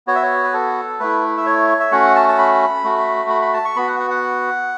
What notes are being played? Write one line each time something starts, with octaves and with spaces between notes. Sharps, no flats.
B3 F#4 C#5
E5
C#5
B4
A4
A3 E4 B4
E5
C#5
E5
A3 C#4 F#4 F#5
A5
A5
B5
A3 F#4
B5
B5
A5
C#6
B3 F#4 B5
F#5
F#5
F#5